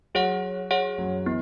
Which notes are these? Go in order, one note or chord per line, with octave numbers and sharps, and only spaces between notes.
F#3 F#4 G#4 C#5 F#5
G#4 C#5 F#5
F#2 F#3
E3 B3